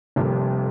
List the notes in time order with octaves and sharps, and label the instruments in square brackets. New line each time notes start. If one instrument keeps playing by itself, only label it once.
[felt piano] F1 F2 C3 G3 A#3